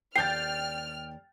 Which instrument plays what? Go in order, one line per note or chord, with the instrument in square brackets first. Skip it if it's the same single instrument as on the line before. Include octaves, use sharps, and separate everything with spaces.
[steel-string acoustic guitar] D#2 D5 [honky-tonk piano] G5 G6 A6 [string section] F6 [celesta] C7